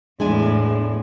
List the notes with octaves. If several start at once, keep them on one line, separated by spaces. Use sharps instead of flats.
E2 A2 G#3 D4 G#5